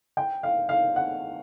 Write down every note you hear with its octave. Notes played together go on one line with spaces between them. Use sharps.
G5
F5
F5
F#5